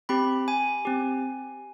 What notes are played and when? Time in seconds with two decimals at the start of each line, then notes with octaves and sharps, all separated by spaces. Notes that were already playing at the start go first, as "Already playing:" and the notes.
0.09 C4 G4 B5
0.48 G#5
0.85 C4 G4